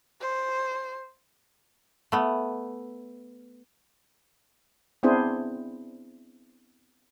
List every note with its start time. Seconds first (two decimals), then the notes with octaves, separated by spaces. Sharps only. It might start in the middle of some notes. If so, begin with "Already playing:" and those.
0.21 C5
2.12 A3 B3
5.03 B3 C4 D4 E4 G#4 C5